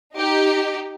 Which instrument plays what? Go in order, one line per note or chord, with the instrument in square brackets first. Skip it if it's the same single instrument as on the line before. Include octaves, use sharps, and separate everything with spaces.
[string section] D#4 G4